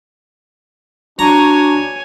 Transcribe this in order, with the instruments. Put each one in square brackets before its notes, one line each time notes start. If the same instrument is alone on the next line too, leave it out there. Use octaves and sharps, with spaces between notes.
[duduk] D4 [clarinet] F#4 [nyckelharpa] C#5 G#5 [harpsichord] A#5